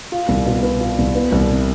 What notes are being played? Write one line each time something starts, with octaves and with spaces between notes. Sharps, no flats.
F4
C2
B2
B3
F4
C2
B3
C2
C3